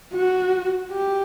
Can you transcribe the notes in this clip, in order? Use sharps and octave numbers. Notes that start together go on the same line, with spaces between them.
F#4
G4